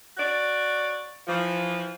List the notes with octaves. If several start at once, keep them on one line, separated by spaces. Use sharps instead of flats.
F#4 C#5 D5
E3 F3